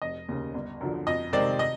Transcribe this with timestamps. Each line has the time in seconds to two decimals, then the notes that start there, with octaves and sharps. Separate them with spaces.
0.02 F1 D#5
0.29 D#2 C#3
0.54 G1
0.81 F#2 D3 F3
1.07 F2 D#5
1.33 C3 D#3 G#3 C4 D5
1.59 D#5